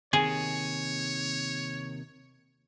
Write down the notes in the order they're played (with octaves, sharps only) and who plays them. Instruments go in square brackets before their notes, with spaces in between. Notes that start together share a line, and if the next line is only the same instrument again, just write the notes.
[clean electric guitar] D#2 C3 D#3 [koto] G#4 [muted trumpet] C#5